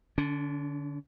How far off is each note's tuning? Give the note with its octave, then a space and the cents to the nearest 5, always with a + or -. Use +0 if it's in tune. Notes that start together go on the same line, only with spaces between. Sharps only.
D3 +0 C#4 +45